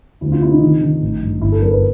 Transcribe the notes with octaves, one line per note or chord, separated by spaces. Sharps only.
D2 E4
F4
C3 E4
D#4
D#3
D#3
A1
G2
G1 E4
A4
F#2 A#4
B4